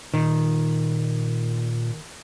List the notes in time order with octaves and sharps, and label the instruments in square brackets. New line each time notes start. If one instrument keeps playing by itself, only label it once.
[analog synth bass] A#2 [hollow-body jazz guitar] D#3